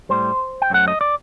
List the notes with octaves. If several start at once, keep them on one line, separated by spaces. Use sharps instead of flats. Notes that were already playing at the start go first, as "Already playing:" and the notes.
A2 G3 C5
G5
F#2 F#3 A3 F#5
D#5
D5